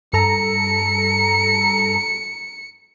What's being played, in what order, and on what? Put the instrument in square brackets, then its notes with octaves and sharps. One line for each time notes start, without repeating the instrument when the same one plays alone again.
[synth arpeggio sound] G2 A4 A#5 [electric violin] C#7